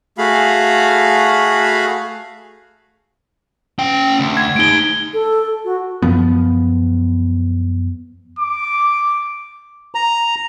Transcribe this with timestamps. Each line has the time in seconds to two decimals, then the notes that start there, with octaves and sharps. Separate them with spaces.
0.18 A3 F#4 G#4 F5 B5
3.79 C#4 G5
4.20 D2
4.37 G#6
4.56 A3 D#4 D7 G7
5.14 A4
5.65 F#4
6.02 F#2 F3 B3
8.39 D6
9.95 A#5